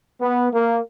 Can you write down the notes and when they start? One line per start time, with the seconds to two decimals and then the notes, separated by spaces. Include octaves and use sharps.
0.21 B3
0.52 A#3